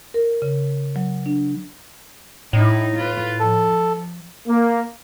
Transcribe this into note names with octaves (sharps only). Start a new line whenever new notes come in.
A#4
C#3
F#3
D4
A2 D#4 E4
F4 B4
F3 A4
A#3